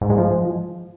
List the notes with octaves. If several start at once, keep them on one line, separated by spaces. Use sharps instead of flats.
G#2
G#3
F3